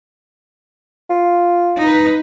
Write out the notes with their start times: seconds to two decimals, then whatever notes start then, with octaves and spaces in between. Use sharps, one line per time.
1.10 F4
1.80 D#4 B4